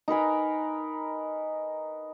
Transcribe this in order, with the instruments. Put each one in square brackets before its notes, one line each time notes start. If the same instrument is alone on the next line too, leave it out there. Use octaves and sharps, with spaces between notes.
[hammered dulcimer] D#4 A#4 B4 G#5